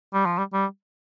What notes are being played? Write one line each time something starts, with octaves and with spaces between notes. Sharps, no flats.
G3
F3
G3
G3